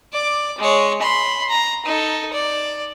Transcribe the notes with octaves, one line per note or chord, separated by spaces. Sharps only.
D5 D6
G#3 C#5
B5 C6
A#5
D#4 A4
D5